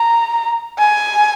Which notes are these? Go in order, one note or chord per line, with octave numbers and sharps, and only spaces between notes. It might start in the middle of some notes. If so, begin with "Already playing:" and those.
Already playing: A#5
G#5